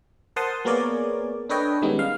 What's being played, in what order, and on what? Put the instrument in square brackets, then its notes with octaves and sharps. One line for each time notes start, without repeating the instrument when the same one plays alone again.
[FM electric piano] A#4 C5 F#5 A5 C6 D#6
A#3 B3 G#4 A#4 C#5 D5
D4 A4 B4 C#5 D#5 G5
D#3 G3 G#3 B3 C#4 D#4
F5